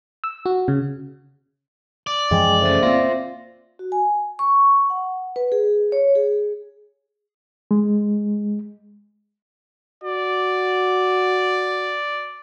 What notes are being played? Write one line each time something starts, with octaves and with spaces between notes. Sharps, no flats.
E6
F#4
C#3
D5
F#2 E3 F3 G#3 G5 G#5
C#3 A3 C5 E5 A6
A#3 C4 F4 A#6
F#4
G#5
C#6
F#5
B4
G#4
C#5
G#4
G#3
F#4 D5